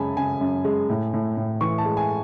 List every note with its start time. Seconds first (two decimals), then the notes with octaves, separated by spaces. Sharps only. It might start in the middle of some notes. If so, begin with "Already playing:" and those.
Already playing: F#2 C#3 G#3 G#5 A5 B5
0.17 C#3 G#5
0.41 F#2
0.65 G#3
0.89 A2
1.13 A2
1.37 A2
1.61 E3 C#6
1.78 A5
1.85 G#3
1.97 G#5